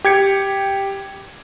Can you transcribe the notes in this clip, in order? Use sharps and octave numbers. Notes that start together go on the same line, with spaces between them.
G4 G#6 C#7